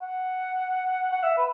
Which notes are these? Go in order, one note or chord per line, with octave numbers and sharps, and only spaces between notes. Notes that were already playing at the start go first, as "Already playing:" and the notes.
F#5
F#5
E5
B4